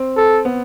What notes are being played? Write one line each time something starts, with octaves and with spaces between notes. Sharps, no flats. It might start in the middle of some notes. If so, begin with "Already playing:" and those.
Already playing: C4
A4
B3